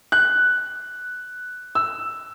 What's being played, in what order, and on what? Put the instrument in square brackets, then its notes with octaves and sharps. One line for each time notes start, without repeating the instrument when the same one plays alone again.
[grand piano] F#6
E6